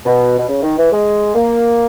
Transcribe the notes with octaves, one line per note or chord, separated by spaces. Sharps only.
B2
B2
C#3
D#3
E3
G#3
A#3